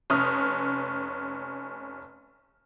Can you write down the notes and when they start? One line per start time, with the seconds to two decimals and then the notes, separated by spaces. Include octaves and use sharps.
0.10 F1 C#4 D#6 F6